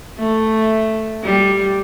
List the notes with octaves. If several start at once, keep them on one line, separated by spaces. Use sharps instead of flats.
A3
G3